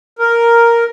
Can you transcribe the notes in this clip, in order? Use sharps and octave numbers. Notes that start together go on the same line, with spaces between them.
A#4